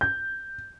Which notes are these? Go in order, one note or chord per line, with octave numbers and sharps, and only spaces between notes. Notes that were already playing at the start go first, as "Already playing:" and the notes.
G6